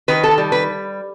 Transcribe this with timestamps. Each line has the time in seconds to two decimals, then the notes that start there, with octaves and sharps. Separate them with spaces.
0.08 D#3 B4
0.24 A4
0.38 G3
0.52 B4